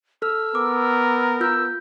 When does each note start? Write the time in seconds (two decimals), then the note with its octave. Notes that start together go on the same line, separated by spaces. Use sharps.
0.22 A4 E6 F6
0.55 B3 A#4 D6
1.40 F4 E6 G6